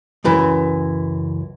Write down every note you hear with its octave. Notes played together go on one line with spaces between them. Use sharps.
C#2 F#2 E3